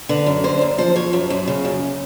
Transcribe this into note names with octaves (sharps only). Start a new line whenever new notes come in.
D3 B4
F#2
D3 C5
F#2
F3 C5
F3 C#5
F#2
F#2
C#3
F#2